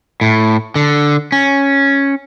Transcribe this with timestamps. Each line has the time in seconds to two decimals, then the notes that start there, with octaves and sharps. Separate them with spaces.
0.21 A2
0.76 D3
1.32 C#4